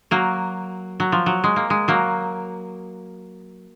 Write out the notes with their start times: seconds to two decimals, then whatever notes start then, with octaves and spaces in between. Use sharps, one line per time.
0.11 F#3 A#3
1.00 F#3
1.12 F3
1.26 F#3
1.44 G#3
1.56 A#3
1.70 G#3
1.88 F#3 A#3